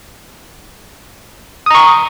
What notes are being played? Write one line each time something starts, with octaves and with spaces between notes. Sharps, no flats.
A#5 C#6 D#6